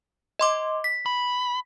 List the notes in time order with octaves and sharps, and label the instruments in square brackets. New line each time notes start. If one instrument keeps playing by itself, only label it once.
[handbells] D#5 C6 D6
B6
[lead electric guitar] B5